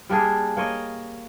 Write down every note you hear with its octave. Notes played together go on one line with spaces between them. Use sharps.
G3 A#3 D4 G#4
A#3 C#5 D#5